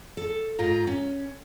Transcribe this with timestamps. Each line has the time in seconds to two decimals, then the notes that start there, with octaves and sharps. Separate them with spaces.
0.17 A4
0.59 G#2 F4 A#5
0.87 C#4